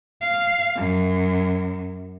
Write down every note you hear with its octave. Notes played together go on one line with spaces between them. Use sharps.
F5
F#2